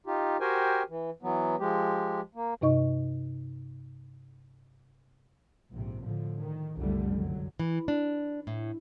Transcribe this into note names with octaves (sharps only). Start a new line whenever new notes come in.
D#4 F4 G4
F#4 G4 A#4 C5 G5 G#5
E3
E3 F#3 B3
F3 G#3 G4
A#3
G2 C3 D#4 D#5 C#6
A#1 G#2 C3
A2 D3 F3
D#3
F#1 C2 F2 D3 G3 A3
D3 F#3
E3
D4
A2